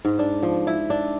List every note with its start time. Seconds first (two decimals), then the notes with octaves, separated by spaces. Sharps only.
0.05 G#2
0.19 D4
0.43 F3
0.67 E4
0.90 D4